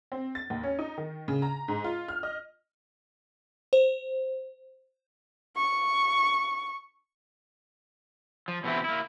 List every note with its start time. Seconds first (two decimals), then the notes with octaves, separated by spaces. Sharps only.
0.12 C4
0.35 A6
0.50 D#2
0.63 C#4
0.79 D#4
0.98 D#3
1.28 C#3
1.42 A#5
1.68 G#2
1.84 F4
2.08 F6
2.23 D#5
3.73 C5
5.57 C#6
8.48 F3
8.64 B2 E3 C4 E4
8.84 A#3 E4